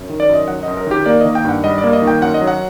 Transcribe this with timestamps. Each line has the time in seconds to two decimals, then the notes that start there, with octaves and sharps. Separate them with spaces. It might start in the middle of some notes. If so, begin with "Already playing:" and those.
Already playing: F#2
0.09 D#3
0.20 D5
0.29 F#2 D#5
0.48 F#3 F#5
0.63 F#2 D#5
0.77 A#4
0.87 D#3 G4
1.06 A#3 D5
1.20 D#3 D#5
1.35 G5
1.45 G2 F#5
1.64 G3 D#5
1.78 D5
1.84 A#3
1.93 D#5
2.02 D#3
2.07 G5
2.21 F#2 F#5
2.34 D#5
2.41 F#3
2.47 F#5